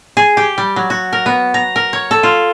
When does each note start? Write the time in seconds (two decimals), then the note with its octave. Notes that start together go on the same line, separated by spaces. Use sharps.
0.17 G#4
0.37 G4
0.58 G3
0.76 F#3
0.90 F#4
1.13 A#4
1.26 B3
1.54 A#5
1.76 A#4
1.93 C#5
2.11 A4
2.23 F4